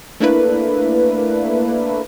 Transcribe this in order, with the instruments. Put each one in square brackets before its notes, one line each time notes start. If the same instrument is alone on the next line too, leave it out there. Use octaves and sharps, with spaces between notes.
[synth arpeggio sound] A3 A#3 D4 E4 B4